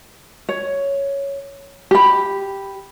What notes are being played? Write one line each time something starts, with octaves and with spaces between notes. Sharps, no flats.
C#5
G4 B5